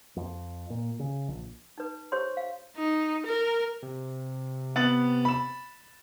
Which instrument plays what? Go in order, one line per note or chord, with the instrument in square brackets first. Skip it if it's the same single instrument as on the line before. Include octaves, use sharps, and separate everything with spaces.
[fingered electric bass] F2
A#2
C#3
A#1
[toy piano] D#4 B4
G4 C5 C#5 C6
F5
[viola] D#4
A#4
[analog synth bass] C3
[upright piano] B3 A6 F#7
B5 E7